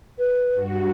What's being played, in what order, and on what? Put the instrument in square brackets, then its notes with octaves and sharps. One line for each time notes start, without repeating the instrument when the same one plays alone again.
[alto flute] B4
[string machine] G2 F#4